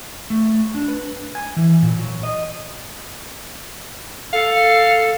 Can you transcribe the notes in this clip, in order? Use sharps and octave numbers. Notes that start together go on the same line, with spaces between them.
A3
D4
B4
G#5
E3
A#2
F#3
D#5
A4 F5